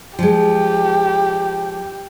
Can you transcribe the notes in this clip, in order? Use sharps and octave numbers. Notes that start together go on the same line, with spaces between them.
F3 G#3 G4